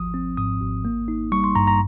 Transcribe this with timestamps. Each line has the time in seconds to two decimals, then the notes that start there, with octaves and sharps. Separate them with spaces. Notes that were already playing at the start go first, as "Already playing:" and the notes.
Already playing: G#1 F3 D#6
0.14 C4
0.37 G#2 D#6
0.61 G#1
0.85 A#3
1.08 D#4
1.32 G3 C#6
1.44 C6
1.55 G2 A#5
1.67 A#5